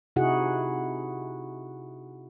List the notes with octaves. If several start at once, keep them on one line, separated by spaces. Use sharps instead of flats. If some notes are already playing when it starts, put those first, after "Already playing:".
C3 D#4 E4 F#4 G#4 F#5